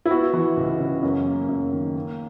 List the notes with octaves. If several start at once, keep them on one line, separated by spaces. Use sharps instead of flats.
E4
B3 F#4
E3
C#2
C#3
F#2
A#3
F#2
D#3
A#3